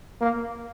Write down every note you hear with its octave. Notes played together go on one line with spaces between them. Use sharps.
A#3